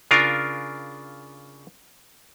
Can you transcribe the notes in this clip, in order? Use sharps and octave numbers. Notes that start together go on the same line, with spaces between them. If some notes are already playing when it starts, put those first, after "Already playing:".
C#3 D4 F4 A#4